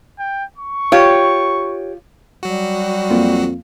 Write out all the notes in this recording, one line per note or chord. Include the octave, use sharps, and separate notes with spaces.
G5
C#6
F4 G4 C#5
F#3 G3 F#4
F2 A#3 F4 F5